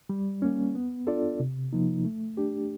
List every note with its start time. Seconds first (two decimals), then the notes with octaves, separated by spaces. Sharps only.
0.09 G3
0.42 A#3 C#4
0.75 B3
1.07 D4 F4 A4 D5
1.40 C3
1.73 F3 A#3 D#4
2.05 A3
2.37 D4 G4